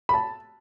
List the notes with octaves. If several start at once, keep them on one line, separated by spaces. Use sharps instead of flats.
B5
A5